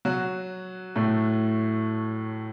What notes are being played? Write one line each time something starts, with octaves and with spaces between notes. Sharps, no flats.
F#3 F#4
A2 A3